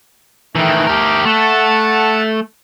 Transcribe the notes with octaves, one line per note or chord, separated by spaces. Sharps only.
D#3 E3 A3 G5
G4 A#4
A3 F#5 A5